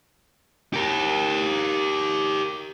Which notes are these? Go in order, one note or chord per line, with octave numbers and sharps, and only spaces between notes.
G4 A#4